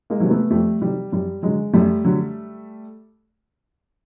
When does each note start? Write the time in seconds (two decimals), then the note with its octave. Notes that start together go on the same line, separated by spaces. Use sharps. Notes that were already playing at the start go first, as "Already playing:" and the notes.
0.10 G#3 A#3
0.20 C3 D#3 F#3
0.30 A3 B3
0.50 F2 G3 A3
0.81 C3 D#3 F#3 G3
1.12 F#2 G3
1.43 D3 F#3 G#3
1.73 F#2 G3 A3
2.05 D3 F#3